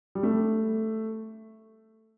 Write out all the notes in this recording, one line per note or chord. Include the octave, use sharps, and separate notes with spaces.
G3
A3